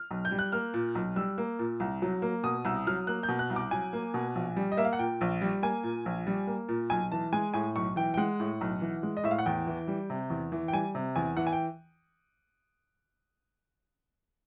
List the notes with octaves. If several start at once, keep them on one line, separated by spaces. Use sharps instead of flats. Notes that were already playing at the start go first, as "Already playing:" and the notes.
Already playing: F6
B1
G6
G3
F#6
A#3 F6
A#2
B1
G3 E6
A#3
A#2
C2
F#3
A#3
B2 D#6
C2 E6
F#3 F6
A#3 F#6
G6
B2
F#6
C2
D6
F#3 G#5
A#3
B2
A#1
G3
D#5
A#3 E5
F5
F#5
A#2 G5
A#1
G3
A#3 G#5
A#2
A#1
G3
A#3
A#2
B1 G#5
E3 A5
G#3 G#5
A2 G#5
B1 C#6
E3 G5
G5
G#3 F#5
A2
B1
E3
G#3
D#5
A2 E5
F5
F#5
E2 G5
E3
G3
C3
E2
E3
G5
G3 G#5
C3
E2 G#5
E3 F#5
G#5
G5